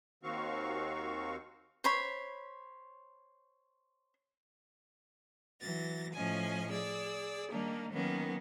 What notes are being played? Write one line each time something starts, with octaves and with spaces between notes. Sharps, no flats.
D#2 D#3 C4 F#4 F5 C#6
C5 C#5 B5
E3 F#3 A6 A#6
A2 F3 C#4 D#5 G#5
G#4 D5 E6
D#3 G3 A#3 D4 D#4
D#3 F#3 A#3 B3 C#4